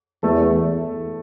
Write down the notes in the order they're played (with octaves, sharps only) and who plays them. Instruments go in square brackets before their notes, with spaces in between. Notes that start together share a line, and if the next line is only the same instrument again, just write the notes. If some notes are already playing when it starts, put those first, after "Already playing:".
[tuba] E2 [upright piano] A3 A4